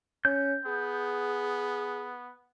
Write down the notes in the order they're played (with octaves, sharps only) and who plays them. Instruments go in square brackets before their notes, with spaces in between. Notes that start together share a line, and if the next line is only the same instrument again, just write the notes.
[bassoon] C#4 [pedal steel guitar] G6
[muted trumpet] B3 [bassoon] G#4